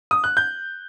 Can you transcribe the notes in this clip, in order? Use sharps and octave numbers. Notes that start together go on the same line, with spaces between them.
D#6
F#6
G6